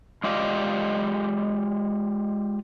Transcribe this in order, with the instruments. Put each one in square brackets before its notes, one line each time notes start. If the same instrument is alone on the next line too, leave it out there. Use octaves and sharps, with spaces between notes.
[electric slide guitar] G#3 F4 G4 D5 D#5 F5